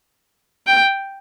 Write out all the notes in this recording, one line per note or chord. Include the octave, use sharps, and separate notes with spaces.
G5